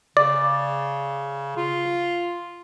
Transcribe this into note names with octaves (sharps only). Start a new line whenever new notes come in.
C#3 D5
F4